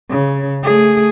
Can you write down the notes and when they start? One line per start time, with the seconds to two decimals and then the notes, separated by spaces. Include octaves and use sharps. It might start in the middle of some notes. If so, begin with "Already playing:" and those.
0.10 C#3
0.63 A3 G#4